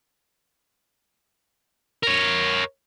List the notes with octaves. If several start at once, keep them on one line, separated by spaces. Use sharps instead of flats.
A#4 C#5